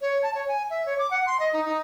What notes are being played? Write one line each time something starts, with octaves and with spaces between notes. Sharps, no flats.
C#5
A5
C#5
G#5
E5
C#5
D6
F#5
C6
D#5
D#4
D#4